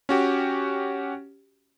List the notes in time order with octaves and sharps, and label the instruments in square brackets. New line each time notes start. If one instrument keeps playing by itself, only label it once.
[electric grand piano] C#4 F#4 G4